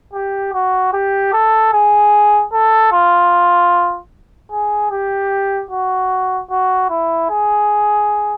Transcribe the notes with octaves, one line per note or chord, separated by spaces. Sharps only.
G4
F#4
G4
A4
G#4
A4
F4
G#4
G4
F#4
F#4
E4
G#4